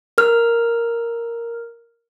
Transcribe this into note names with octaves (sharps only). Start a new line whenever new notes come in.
A#4 F6